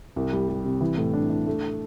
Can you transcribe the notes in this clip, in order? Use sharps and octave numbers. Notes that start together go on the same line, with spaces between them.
C2
G3
G3
C3
E3
A2
D4
D4
A3